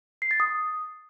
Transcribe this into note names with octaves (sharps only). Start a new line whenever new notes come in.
C7
A6
D#6